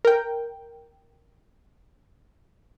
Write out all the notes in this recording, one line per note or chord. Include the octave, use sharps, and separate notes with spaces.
A#4 G5